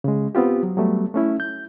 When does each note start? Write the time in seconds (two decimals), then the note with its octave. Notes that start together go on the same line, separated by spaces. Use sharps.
0.04 C#3 G#3
0.35 B3 C4 F4 G4
0.63 F#3
0.77 F#3 G3 A3 B3
1.14 A3 C#4 E4
1.40 G6